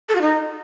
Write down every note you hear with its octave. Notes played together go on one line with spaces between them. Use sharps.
A4
F#4
D#4